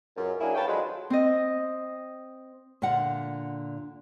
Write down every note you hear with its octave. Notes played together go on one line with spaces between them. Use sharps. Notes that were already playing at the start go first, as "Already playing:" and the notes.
C#2 F#2
F#3 A#3 D4 E4 G#4
B4 C#5 F5 G5 A5
D3 F3 F#3 G#3 B4 C5
C4 D#5
A#2 D3 F4 F#5